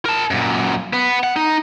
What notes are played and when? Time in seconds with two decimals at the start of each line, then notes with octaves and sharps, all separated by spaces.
0.05 A#4 A5
0.31 F#2 A#2
0.93 B3
1.23 F#5
1.36 D#4